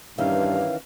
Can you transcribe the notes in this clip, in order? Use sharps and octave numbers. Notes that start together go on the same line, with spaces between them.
G2 D#3 E3 C#4 F5